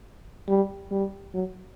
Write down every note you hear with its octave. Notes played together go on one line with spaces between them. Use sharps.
G3
G3
F#3